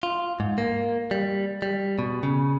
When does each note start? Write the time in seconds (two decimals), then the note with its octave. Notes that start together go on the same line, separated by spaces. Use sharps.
0.03 F4
0.40 G#2
0.58 A#3
1.11 G3
1.62 G3
1.99 B2
2.23 C#3